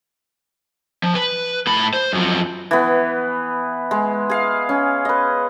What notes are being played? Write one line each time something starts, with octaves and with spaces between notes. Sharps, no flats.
F3
B4
A2 B5
C5
F#2 F3
E3 B3
G#3
G#4 F5
C#4
B4 D#5